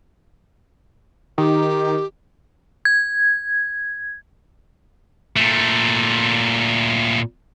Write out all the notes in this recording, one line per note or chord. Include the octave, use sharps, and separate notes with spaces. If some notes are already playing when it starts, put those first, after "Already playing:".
D#3 G4
G#6
A#2 A3